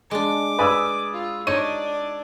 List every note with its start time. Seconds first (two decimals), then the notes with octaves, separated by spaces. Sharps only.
0.11 G#3 D4 D6
0.59 B4 D5 G#5 D#6 E6
1.13 F4
1.47 D4 D#4 C#5 D5 D#7